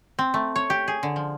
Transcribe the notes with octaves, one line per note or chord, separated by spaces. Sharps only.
C4
A3
C#5
G4
G#4
D3
F3